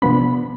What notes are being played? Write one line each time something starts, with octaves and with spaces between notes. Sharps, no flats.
C3 F3 B3 D4 B5